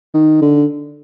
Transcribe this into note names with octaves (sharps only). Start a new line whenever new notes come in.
D#3
D3